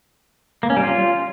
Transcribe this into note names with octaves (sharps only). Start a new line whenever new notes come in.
A#3
C#4
G3
F4